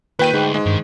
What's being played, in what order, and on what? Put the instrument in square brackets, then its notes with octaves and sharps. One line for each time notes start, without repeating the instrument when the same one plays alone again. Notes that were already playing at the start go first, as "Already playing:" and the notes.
[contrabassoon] A#2 [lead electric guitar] D#3 [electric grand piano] B4 G5 D#7
[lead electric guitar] D2 [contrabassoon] G#2
[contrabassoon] G#2 [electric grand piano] G#3
[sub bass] G2 [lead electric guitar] D#3